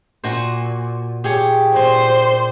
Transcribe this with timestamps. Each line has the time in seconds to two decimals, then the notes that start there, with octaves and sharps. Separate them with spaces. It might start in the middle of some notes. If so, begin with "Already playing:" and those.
0.24 A#2 F#4 C5
1.24 G4 G#4 C#5
1.76 A#2 C5